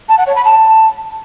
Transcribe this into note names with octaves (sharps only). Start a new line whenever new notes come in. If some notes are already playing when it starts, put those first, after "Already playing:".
A5
F#5
C#5
B5
A5